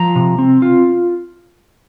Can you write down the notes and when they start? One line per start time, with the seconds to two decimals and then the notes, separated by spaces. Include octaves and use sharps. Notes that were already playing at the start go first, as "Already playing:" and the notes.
Already playing: F3 A#5
0.16 C3
0.39 C4
0.62 F4